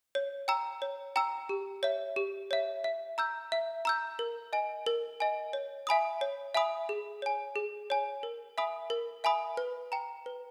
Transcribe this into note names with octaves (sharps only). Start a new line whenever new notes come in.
C#5
G5 A#5 E6
C#5
G5 A#5 E6
G4
C#5 E5
G4
C#5 E5
E5
A#5 E6 G6
E5
A#5 E6 G6
A#4
D#5 G#5
A#4
D#5 G#5
C#5
E5 G#5 B5 D#6
C#5
E5 G#5 B5 D#6
G#4
C#5 G#5
G#4
C#5 G#5
A#4
E5 G#5 B5 D#6
A#4
E5 G#5 B5 D#6
B4
G5 A#5
B4